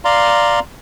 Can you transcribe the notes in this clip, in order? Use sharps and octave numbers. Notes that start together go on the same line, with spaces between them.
D5 F5 A#5 C6